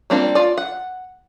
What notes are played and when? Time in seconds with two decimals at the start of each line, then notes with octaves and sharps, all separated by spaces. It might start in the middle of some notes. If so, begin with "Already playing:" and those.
0.10 G3 A#3 C4 D4 F4
0.35 F4 D5
0.58 F#5